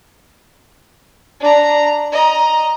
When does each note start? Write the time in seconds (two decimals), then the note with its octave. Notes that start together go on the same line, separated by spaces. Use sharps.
1.40 D4 A#5
2.12 D#5 A#5